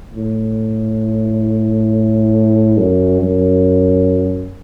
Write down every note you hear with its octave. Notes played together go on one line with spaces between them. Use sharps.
A2
F#2
F#2